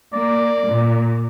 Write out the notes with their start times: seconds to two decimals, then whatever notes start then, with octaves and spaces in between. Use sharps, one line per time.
0.14 A#3 D5
0.67 A#2